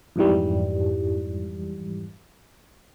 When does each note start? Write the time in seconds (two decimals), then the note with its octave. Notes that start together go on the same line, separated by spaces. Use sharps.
0.16 F2 G#2 E3 G3